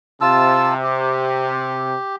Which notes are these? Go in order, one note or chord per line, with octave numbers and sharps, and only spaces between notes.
C3 F4 A5 E6
G4